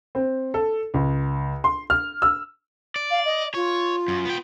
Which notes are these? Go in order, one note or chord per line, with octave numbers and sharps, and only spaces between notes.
C4
A4
C#2
C6
F6
E6
D5
F5
D#5
F4 C#5
F#2
B3 G5